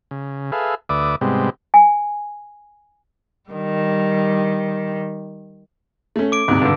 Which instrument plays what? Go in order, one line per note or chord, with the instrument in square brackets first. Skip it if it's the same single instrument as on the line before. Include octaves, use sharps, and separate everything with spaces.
[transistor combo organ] C#3
G#4 A4 B4 E5 F5
D2 B4 D5 E5 D6 D#6
G#2 C3 G3 G#3 B3 C4
[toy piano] G#5
[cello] D#3 G3
[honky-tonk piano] A3 C#4
[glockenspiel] D6 D7
[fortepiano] D2 [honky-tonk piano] G#2 C3
[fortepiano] G2 D3